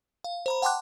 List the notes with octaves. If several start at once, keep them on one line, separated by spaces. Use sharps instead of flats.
F5
C5 A#5 B5
F#5 G5 A5 C6 D6 F#6